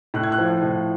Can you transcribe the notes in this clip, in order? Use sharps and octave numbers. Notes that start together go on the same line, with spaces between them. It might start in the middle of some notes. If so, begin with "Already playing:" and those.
A2 F#6
G#6
F#6
F3
A2